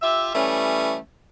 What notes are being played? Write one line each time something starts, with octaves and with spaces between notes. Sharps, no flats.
F4 G4 E5
E3 G3 A3 C#4